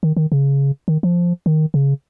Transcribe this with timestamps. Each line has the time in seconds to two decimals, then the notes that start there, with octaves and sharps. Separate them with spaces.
0.03 D#3
0.17 D#3
0.32 C#3
0.88 D#3
1.03 F3
1.46 D#3
1.74 C#3